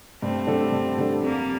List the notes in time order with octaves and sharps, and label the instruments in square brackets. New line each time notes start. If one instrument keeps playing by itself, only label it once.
[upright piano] G2 [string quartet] A3 C4
[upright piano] D3 G3 D4 A4
G2
D3 G3 D4 A4
[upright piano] F2 [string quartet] G3 A#3